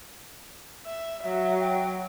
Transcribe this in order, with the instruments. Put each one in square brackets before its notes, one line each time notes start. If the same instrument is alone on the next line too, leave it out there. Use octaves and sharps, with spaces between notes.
[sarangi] E5
[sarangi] F#3 [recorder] E5
[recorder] G5